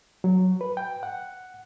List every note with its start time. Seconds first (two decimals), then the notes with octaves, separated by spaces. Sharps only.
0.24 F#3
0.61 B4
0.77 G5
1.03 F#5